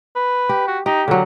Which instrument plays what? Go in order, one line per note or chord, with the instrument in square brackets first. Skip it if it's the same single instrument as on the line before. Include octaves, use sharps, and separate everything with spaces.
[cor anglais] B4
[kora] G4
[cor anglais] F#4
[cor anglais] D#4 [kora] G4
[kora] D3 F#3 [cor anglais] A#3